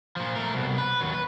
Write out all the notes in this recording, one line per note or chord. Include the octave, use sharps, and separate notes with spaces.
A#2 F3
A3 A#4
C2 B2
B4
D#2 F#3
B4